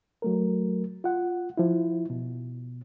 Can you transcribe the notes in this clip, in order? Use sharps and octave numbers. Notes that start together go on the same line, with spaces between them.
F#3 A3 A#4
F4 F#5
F3 E4
B2